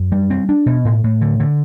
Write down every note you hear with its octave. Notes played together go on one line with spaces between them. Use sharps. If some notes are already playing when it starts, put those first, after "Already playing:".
Already playing: F#2
G3
C4
D4
B2
A2
A2
D3
D3